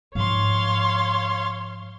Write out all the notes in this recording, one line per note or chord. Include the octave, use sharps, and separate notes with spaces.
G#2 F3 C#5 F5 C6